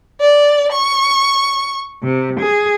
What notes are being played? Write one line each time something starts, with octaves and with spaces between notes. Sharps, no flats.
D5
C#6
C3
G#4